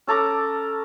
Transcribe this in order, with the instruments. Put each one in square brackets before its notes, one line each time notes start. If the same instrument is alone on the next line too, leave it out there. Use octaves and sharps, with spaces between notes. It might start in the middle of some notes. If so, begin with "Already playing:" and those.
[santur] C#4 A4 A#5 D6